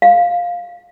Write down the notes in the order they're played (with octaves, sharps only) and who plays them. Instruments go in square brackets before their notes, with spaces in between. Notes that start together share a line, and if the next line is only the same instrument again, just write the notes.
[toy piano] F5